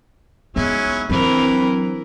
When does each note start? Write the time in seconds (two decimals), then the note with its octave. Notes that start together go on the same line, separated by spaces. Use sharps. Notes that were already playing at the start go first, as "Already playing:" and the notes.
0.56 F#3 G#3 B3 C#4 D#4 E4
1.09 E3 F#3 C4 D4 A#4 B5